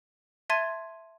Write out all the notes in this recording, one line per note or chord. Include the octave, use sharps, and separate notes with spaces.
E5 A5 C6 G#6 A6 D#7